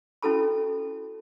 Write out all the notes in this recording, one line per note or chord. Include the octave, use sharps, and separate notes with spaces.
C#4 E4 F#4 A4 A5 B5